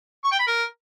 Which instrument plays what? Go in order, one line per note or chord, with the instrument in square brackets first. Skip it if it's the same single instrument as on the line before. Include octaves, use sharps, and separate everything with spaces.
[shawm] C#6
G5
B5
A#4